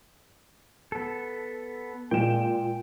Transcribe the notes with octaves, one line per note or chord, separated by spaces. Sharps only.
B3 A4
A#2 G#3 G5 E7